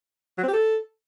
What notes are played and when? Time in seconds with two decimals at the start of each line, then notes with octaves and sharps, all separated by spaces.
0.38 F#3
0.43 C4
0.48 G4
0.53 A4